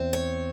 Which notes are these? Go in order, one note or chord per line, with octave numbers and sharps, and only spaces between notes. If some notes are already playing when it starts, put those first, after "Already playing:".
Already playing: E2 C4
C#5